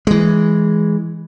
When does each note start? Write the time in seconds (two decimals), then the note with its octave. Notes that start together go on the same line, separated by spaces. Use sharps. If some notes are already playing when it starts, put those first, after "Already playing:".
0.07 E3 G#3